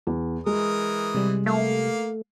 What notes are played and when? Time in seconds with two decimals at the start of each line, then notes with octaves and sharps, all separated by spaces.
0.07 E2
0.46 E3 G#3 A#4 D#6
1.14 C3 G3
1.46 A3 A#3 F5